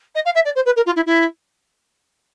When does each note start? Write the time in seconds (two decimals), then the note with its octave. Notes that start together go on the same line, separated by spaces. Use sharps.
0.14 D#5
0.25 F5
0.34 E5
0.44 D5
0.55 C5
0.65 B4
0.76 A#4
0.86 F4
0.96 E4
1.06 E4